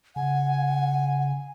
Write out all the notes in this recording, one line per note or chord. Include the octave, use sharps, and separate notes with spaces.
C#3 F#5 G#5